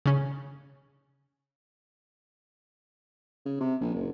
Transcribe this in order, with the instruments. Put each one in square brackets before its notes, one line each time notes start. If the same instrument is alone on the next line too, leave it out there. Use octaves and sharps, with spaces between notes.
[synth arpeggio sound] C#3 C#4
[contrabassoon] C#3
C3
A#1
F#1